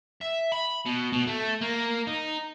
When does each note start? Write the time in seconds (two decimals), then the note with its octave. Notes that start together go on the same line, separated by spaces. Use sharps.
0.21 E5
0.52 B5
0.86 B2
1.13 B2
1.27 A3
1.61 A#3
2.07 D#4